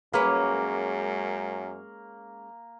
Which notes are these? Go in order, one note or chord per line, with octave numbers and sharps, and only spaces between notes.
F#2 G#3 A#3 C#4 B4